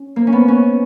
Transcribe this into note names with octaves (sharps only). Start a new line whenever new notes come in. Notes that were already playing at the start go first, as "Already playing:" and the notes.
Already playing: C#4
A#3
C#4
B3
C#4